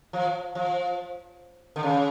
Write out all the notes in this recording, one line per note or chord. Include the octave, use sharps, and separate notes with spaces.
F3
F3
D3
C#3